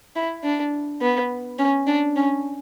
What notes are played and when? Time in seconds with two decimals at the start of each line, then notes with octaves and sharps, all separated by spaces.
0.16 E4
0.44 D4
1.01 B3
1.58 C#4
1.87 D4
2.16 C#4